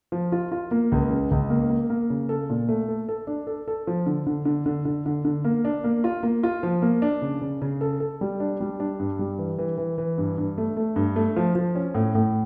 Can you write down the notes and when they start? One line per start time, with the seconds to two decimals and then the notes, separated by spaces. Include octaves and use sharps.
0.12 F3
0.32 F4
0.52 F4
0.71 A#3
0.92 C#2
1.10 C#3
1.31 C#2
1.50 A#3
1.69 A#3
1.90 A#3
2.10 C#3
2.29 A4
2.50 A#2
2.69 A3
2.88 A4
3.09 A4
3.27 D4
3.47 A4
3.68 A4
3.87 F3
4.06 D3
4.27 D3
4.45 D3
4.66 D3
4.85 D3
5.06 D3
5.25 D3
5.44 A#3
5.65 D4
5.84 A#3
6.04 F4
6.23 A#3
6.43 F4
6.63 F3
6.82 A#3
7.02 D4
7.22 C#3
7.41 C#3
7.62 C#3
7.81 A4
8.00 A4
8.21 G3
8.40 D4
8.61 G3
8.80 D4
9.00 G2
9.19 G3
9.39 E3
9.58 E3
9.78 E3
9.98 E3
10.18 G2
10.38 G2
10.58 A3
10.77 A3
10.96 G2
11.16 A3
11.36 F3
11.55 F3
11.76 C#4
11.94 A2
12.15 A2